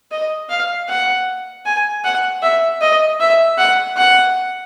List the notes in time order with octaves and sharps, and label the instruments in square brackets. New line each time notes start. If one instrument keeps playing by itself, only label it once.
[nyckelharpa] D#5
F5
F#5
G#5
F#5
E5
D#5
E5
F#5
F#5